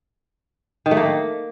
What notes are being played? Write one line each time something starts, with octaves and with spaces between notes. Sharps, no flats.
D#3
A3
A#3